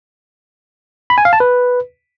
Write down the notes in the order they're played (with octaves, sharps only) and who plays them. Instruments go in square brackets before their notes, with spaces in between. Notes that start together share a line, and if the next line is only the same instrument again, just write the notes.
[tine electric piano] B5
G#5
F5
A5
B4